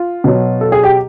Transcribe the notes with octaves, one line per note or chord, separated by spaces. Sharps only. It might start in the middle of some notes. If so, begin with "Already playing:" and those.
Already playing: F4
B2 F#3
A4
G#4
G4